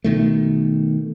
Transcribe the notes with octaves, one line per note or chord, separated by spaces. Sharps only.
B2 D#3 A3